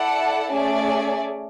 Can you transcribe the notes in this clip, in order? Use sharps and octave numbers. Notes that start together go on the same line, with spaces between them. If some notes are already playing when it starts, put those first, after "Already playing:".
Already playing: E4 A4 D5 F#5 A5
A3 C#4 G#4 D5